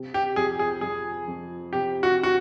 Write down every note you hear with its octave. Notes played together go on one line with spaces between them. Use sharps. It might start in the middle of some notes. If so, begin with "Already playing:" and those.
Already playing: C3
G4
F2 G#4
G#4
F2 G#4
F2
C3 G4
F#4
F#4